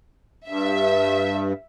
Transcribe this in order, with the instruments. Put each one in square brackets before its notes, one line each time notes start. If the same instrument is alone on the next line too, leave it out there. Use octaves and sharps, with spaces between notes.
[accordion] G2 [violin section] E5